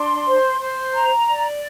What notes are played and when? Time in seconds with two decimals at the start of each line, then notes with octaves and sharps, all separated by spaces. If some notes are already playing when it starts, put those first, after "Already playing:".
Already playing: D4 C6
0.27 C5
0.60 C5
0.94 A#5
1.28 D5